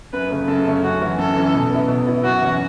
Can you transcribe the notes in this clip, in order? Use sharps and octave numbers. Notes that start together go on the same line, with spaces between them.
F#2 B4
C#3 A3 C#4
F#2 A4
C#3 A3 C#4
F#2 F#4
E3 C#4
F#2 A4
E3 C#4
B2
B3 E4
B2
B3 E4
F#2 F#4
E3 C#4